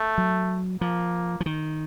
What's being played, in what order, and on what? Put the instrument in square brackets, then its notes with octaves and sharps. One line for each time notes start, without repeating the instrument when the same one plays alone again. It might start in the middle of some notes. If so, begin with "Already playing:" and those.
Already playing: [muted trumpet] A3
[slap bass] F#3
[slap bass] F3 [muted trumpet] A#3
[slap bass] F3
D#3